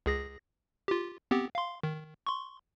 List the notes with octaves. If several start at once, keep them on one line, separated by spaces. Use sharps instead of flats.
C#2 G#4 A#6
F4 G4
B3 C4 G4
F5 C6
D#3
C6 C#6